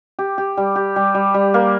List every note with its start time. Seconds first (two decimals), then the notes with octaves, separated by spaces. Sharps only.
0.19 G4
0.38 G4
0.57 G3
0.76 G4
0.96 G3
1.15 G3
1.34 G3
1.54 A#3